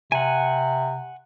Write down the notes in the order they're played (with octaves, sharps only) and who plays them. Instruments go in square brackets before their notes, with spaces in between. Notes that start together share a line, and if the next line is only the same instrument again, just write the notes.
[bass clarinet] C3 [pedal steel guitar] F#5 G#5